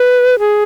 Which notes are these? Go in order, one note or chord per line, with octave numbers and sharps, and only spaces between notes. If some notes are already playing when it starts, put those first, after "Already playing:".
Already playing: B4
G#4